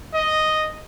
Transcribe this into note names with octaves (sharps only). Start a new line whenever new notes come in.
D#5